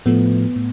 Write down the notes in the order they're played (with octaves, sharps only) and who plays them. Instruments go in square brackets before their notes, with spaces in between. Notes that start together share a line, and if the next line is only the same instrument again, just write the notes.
[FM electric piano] A2 F3 A3 B3
A2